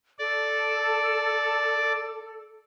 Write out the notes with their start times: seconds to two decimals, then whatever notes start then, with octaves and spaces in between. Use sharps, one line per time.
0.19 A4 D5